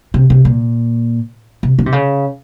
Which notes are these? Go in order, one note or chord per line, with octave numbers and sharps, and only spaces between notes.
C3
C3
A#2
C3
D#3
C3
C#3